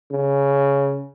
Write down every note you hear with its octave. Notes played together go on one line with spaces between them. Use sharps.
C#3